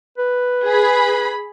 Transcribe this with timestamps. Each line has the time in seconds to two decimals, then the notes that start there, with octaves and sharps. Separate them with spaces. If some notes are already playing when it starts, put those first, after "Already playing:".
0.18 B4
0.64 G#4 B5